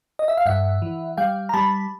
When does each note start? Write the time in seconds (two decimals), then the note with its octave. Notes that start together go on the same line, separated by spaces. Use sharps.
0.19 D#5
0.28 E5
0.37 F5
0.46 G2 E5 F#5
0.82 E3
1.17 G3 F5 G5
1.49 A#5
1.54 G3 A5 B5